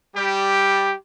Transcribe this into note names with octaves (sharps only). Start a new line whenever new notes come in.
G3 G4